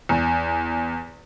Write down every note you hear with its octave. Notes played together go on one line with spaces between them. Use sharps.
E2